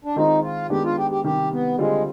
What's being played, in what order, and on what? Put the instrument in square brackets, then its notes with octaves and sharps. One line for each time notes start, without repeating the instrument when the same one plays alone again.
[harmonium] D4
[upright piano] D#3 G#3 C4 F4 [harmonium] D#4
[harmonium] F4
[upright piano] D#3 G#3 B3 D4 [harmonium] G4
[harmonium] F4
G4
G4
[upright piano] C3 D#3 G3 [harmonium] G4
[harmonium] B3
[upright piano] D3 G3 C4 F4 [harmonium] G#3